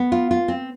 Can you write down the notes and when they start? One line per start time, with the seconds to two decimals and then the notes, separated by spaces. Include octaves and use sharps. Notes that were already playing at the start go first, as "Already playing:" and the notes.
Already playing: B3
0.12 F4
0.31 F4
0.48 C4